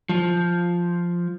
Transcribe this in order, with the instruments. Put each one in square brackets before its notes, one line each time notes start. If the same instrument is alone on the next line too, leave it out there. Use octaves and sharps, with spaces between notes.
[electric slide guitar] F3